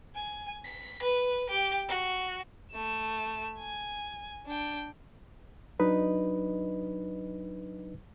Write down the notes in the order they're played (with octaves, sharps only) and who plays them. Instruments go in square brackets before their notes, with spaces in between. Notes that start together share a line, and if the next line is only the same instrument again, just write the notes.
[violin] G#5
B6
B4
G4
F#4
A3 E7
G#5
D4 G5
[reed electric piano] F#3 D4 D#4 B4 D#5